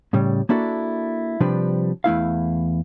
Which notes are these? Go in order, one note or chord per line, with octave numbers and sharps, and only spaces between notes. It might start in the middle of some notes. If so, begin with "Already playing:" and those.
A2 C#3 G3
A#3 D4 E4 F#4 A4
C3 F3 G3 D4 B4
E2 A3 E4 F5